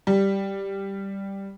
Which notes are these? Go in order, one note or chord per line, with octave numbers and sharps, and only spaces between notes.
G3